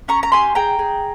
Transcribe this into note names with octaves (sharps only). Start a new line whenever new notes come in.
C#4 A#5 C#6
A#5
G4 G#5 C6
G#4 G5 A#5
G#4